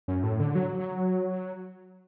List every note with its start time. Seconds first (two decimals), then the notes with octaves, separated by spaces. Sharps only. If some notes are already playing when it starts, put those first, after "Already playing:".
0.08 F#2
0.23 A2
0.40 D3
0.55 F#3
0.79 F#3